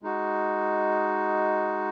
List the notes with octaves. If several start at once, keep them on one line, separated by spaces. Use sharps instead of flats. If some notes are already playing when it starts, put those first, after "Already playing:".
G#3 D#4 F#4